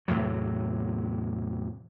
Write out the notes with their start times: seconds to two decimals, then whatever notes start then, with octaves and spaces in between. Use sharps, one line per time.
0.08 E2 A2 C3 F#3